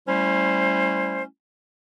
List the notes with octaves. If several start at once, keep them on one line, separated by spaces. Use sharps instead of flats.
G3 A3 C#4 E4 C5